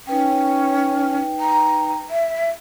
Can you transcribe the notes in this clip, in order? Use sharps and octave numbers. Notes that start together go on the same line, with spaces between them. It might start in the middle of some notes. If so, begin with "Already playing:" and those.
C#4 D#4 B4 G5
A#5
E5